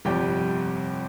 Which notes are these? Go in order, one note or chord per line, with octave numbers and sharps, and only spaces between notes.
G1 F2 C3 G3 G4 G5